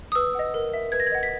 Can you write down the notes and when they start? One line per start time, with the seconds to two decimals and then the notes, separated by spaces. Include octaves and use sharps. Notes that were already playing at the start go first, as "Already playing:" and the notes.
0.12 D#6
0.15 B4 E6
0.35 D#5 F#5
0.54 A#4
0.74 E5
0.92 B4 G#6
1.00 A#6
1.07 G#6
1.12 D#5 F#5
1.23 B6